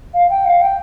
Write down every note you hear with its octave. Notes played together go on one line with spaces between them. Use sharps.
F5
G5
F5
G5